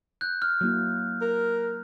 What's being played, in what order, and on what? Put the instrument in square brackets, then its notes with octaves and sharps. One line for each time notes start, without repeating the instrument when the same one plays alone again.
[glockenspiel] F#6 G6
F6
[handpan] F#3 A#3 E4
[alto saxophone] A#4